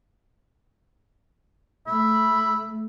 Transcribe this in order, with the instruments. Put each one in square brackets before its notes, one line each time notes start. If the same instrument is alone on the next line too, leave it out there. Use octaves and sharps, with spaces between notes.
[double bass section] A3 [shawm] E5 [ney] B5